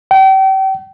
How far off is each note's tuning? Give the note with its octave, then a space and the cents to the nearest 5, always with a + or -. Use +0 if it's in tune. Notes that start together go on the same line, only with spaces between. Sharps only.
G5 -35